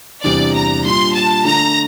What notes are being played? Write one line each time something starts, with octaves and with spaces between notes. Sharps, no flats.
E2 C3 G3 D4 D5
A#5
A#2 G3 D4 C6
A5
D3 A3 D4 A#5